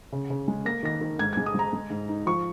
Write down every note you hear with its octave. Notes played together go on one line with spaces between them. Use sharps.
C#3
C#3
G#3
A#3 A#6
D#3 A#6
D#3
G#2 G#6
G#3 G#6
D#6
G#3 A#5
G#3
G#2
D#4
F3 C#6